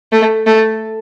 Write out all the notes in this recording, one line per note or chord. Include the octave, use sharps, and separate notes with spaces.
A3
A3